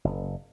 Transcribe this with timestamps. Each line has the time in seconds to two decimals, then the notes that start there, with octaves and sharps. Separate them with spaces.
0.04 F#1